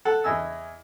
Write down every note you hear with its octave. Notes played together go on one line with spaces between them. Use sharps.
A4 F#5
E2 D#5 G#5 E6